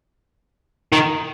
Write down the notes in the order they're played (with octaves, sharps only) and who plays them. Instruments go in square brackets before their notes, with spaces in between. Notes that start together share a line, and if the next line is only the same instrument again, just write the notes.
[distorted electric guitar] D#3